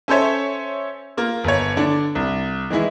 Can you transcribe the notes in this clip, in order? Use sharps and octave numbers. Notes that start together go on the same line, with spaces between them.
C#4 A4 C5 C#5 E5
A#3 F4
G1 C#5
D3 D4
C2
D#3 E3 G#3 E4